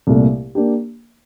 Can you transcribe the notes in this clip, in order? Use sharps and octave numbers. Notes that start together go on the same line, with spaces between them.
C2 A#2 A3
A#3 D4 G4